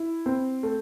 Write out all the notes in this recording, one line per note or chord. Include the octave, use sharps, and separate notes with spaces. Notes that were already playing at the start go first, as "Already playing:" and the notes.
Already playing: E4
C4
A3